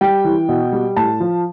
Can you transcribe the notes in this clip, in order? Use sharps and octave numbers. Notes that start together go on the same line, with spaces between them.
G3 G5
E3
B2
G3
A2 A5
F3